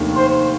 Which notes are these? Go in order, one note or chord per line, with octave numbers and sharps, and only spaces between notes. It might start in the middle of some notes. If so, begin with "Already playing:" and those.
Already playing: F1 D#2 D#3 A3 D4
C5